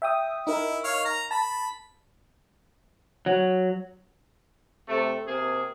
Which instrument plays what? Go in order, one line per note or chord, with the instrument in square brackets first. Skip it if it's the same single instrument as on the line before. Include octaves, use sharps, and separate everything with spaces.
[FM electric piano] E5 G5 D#6
[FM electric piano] D#4 A#4 [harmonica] E4
[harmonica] C#5 F5
A#5
[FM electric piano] A5 [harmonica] B5
[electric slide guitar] F#3
[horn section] C3 A3
C3 A#3 G#4